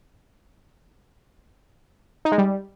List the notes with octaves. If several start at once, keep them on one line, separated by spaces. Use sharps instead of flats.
D#4
G#3
G3